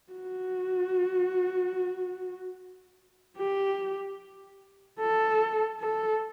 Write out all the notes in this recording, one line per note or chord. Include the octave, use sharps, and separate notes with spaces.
F#4
G4
A4
A4